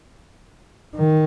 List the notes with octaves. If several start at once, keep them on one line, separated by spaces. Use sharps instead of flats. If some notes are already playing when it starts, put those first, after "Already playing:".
D#3